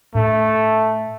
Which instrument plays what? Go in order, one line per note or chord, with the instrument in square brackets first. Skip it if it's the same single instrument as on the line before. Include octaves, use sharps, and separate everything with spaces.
[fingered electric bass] A2 D4 [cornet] A3